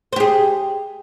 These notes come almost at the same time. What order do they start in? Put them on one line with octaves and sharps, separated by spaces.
C5 G4 G#4